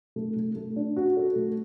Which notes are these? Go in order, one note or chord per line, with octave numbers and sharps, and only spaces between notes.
A3
A3
A3
D4
F#4
A4
A3